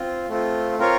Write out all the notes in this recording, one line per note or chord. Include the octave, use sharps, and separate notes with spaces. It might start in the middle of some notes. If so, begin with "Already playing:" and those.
Already playing: C4 F4
A3 C4 F4
C4 F4 A#4 C#5 F5